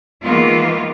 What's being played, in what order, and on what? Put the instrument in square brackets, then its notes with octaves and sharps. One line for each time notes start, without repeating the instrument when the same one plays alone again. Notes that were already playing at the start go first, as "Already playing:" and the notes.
[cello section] D#3 E3 G#3 A#3 B3 F4